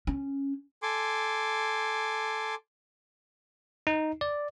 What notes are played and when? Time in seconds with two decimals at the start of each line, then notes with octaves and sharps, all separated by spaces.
0.07 C#4
0.82 A4 G#5 C6 D6
3.87 D#4
4.21 D5